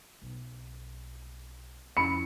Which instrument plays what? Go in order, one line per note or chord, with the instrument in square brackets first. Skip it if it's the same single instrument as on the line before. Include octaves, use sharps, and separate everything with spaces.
[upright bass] B1
[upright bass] F2 [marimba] C#4 E4 [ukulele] B5 [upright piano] C#7